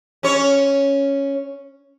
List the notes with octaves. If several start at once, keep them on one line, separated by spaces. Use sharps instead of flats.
C#4 C#5